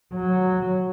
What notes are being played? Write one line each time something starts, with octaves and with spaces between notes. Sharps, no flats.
F#3